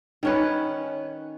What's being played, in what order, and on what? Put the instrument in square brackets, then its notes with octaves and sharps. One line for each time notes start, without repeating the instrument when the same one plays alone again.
[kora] D#3 C#4 B4